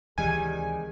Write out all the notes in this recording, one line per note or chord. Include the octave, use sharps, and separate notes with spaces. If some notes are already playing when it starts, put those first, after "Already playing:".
D2 C3 D#3 E3 G3 G#3 G#4 G#5